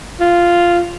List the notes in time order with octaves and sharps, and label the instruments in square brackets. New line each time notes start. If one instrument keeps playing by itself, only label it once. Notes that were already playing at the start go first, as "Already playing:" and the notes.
[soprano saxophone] F4